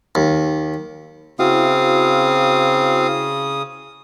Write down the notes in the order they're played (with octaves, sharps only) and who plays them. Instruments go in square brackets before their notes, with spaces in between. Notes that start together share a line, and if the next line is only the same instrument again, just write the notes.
[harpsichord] D#2
[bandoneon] C#3 D#6 [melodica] C4 F5 [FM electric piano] E4 F#4